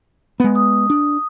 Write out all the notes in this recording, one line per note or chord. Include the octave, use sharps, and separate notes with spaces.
G#3 B3
D#6
D4